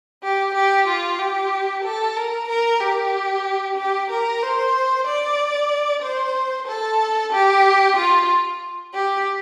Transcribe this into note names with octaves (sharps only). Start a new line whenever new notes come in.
G4
G4
F4
G4
A4
A#4
A#4
G4
G4
A#4
C5
D5
C5
A4
G4
F4
G4